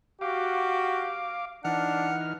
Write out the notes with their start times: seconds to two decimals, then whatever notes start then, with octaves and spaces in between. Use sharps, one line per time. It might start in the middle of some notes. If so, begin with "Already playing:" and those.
0.21 F#4 G4 F5 D6
1.65 E3 D4 D#4 F#5 F6